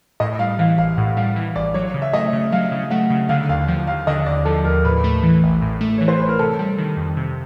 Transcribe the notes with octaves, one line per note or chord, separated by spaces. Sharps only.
A2 D#5
G3 F5
E3 F5
A#1 F5
A2 F#5
G3 F5
E3
A#1 D5
F#3 C#5
C#3
E5
A3 D#5
C#3
F#3 F5
C#3
A3 F#5
C#3
D3 F5
D#2 F5
F3
D#2 F5
D3 D#5
D#2 D5
F3 A4
D#2 A#4
A2 B4
A3
E3
A1
A2
A3
E3 C#5
C5
A1 B4
A#4
C3 A4
G3
D#3
F2
C3